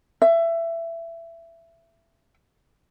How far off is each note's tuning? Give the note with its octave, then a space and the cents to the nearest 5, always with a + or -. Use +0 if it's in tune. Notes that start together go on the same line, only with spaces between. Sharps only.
E5 +20